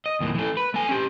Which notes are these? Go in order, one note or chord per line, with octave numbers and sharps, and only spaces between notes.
D#5
D#2 A2
E3 A3
B4
A3 G#5
C#4 G4